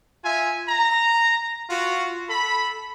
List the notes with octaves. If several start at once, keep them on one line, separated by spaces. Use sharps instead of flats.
F4 E5 G#5
A#5
F4 F#4
A4 B5